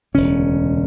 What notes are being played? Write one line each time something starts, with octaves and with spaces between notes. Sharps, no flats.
E1 D2 C#3 C#4